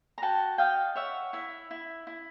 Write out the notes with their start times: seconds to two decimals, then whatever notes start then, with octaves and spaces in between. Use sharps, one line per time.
0.18 A#5
0.22 F#4 G5 A5
0.58 D#5 F5 G5
0.95 C#5 E5 F#5
1.33 E4 E5
1.71 E4
2.07 E4